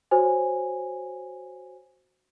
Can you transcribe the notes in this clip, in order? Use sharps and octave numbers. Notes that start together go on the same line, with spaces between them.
F#4 C5 C#5 G#5